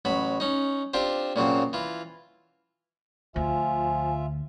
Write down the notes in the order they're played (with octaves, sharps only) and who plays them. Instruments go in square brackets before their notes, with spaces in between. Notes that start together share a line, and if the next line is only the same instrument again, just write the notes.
[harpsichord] A1 F#3 B5
C#4 D#4
C4 D4 F4 G4 C5
A#2 C#3 F#3 C4
E3 F4
[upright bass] D2 [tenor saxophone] F3 [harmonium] F4 E5 [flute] G#5